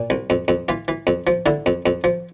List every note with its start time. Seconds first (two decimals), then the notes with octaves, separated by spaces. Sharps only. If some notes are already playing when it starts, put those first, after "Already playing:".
Already playing: A#2
0.10 C2
0.30 F2
0.48 F2
0.68 E3 F4
0.88 E3
1.07 F2
1.27 F3
1.46 D3 E4
1.66 F2
1.86 F2
2.04 F3